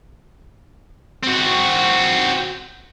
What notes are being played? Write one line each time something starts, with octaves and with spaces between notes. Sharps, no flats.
C4 F#4